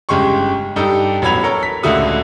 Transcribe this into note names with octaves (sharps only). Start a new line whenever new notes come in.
G1 C#3 G#3 G4 C6 C#6
G2 D#4 G4 A4
A1 F#3 B3 B5 G#6 F7
A4 A#4 C#5
B6
C#2 A2 D3 E4 F#4 D#6